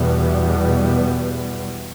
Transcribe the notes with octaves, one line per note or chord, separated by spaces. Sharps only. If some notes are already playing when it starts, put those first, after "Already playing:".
Already playing: E2 B2 G3 B3